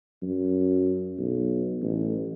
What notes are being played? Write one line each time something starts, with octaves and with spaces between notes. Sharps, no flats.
F#2
B1
A1